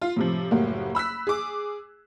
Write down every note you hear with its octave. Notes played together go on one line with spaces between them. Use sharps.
F4
A2 C3 F3
F#1 A2 G3 A#3 F#4
B5 E6 F#6 B6
G#4 D6